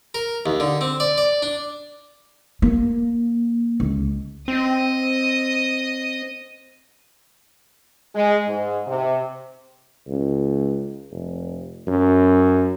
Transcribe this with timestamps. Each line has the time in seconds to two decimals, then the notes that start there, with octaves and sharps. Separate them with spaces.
0.14 A#4
0.46 D#2
0.60 D3
0.81 C4
1.00 D5
1.18 D5
1.42 D4
2.62 A#3
3.80 C#2
4.48 C4 D#5
8.14 G#3
8.47 G#2
8.87 C3
10.08 C#2
11.11 F1
11.87 F#2